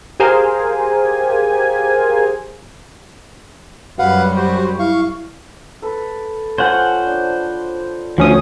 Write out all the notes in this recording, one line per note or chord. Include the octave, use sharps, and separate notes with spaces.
G4 G#4 A#4 C5 F5 G#5
F#2 F#3 G3 B4 F5 F#5
F#4 C5
E4 F5 C#6
A4 B4
F3 C#4 C5 F#5
D4
D2 F3 C#4 D#6